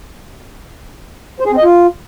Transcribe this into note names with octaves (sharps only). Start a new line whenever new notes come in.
C5
G#4
C4
D#5
F4